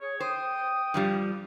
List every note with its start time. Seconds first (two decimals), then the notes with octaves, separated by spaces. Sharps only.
0.01 G#4 C#5
0.20 C5 G5 D#6
0.94 G2 F3 G3